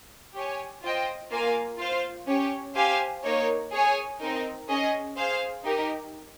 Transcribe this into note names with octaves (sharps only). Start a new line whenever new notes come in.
G4 C#5 G#5
F4 C5 D#5 G5
A#3 F4 A#4 F5 G#5
F4 C5 F5
C#4 G4 C#5
G4 C5 F5 G#5
A#3 D#4 A#4 C#5
G#4 C#5 G#5
C4 D#4 A#4
C#4 G#4 D#5
G#4 C5 F5
D#4 G4 A#4